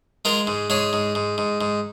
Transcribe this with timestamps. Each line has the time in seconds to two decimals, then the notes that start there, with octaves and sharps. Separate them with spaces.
0.25 G#3 F4 A#4
0.47 G#2
0.70 G#2 G#4 C#5
0.93 G#2
1.15 G#2
1.38 G#2
1.61 G#2